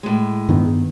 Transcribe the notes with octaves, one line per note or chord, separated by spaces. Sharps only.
A2 G#3
G2 D#3 B3